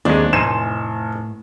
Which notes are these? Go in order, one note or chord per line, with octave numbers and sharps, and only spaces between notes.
D#2 D#3 G#3 C4 D4
F1 A2 D#4 C5 G#5 E7